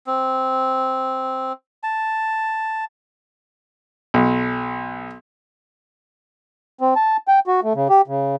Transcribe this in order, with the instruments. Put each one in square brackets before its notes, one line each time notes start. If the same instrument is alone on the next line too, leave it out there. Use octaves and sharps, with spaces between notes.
[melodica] C4
A5
[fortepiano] B1
[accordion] C4
A5
G5
F#4
A3
C#3
G4
C#3